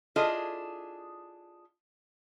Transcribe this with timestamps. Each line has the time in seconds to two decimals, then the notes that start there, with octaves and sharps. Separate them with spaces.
0.16 D4 E4 F4 G#4 A4 D#5